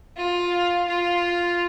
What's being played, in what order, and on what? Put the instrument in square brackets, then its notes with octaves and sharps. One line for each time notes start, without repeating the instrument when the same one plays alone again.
[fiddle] F4
F4